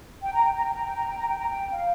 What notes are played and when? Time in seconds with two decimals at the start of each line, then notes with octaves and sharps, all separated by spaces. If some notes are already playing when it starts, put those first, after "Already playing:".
0.22 G5
0.34 A#5
0.44 G5
0.54 A#5
0.65 G5
0.75 A#5
0.86 G5
0.96 A#5
1.07 G5
1.18 A#5
1.28 G5
1.39 A#5
1.49 G5
1.71 F5